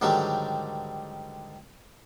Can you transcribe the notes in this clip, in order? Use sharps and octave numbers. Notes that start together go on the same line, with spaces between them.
G#2 D3 D#3 F#3 G3